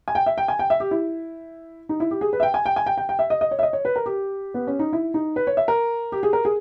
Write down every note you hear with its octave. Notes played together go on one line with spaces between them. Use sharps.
G#5
G5
E5
G5
G#5
G5
E5
G4
E4
D#4
E4
G4
G#4
B4
E5
G5
G#5
G5
G#5
G5
G5
G5
E5
D#5
D#5
C#5
E5
D#5
C#5
B4
A#4
G4
B3
C#4
D#4
E4
D#4
B4
C#5
E5
A#4
G4
G#4
A#4
G#4